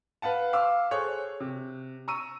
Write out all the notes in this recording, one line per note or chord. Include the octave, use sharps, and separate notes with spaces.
B4 F5 F#5 A5
F5 C6 D6 E6
G#4 A4 C5 C#5 C#6 F#6
C3
A#5 C#6 E6 D#7